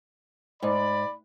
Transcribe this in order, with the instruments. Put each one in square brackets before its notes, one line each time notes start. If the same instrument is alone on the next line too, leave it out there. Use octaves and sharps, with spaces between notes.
[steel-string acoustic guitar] G#2 [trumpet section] D5 B5